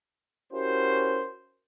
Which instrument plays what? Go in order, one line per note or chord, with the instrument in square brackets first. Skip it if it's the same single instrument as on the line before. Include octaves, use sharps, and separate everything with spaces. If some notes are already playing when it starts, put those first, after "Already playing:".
[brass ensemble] C#4 E4 F#4 G4 A#4 C5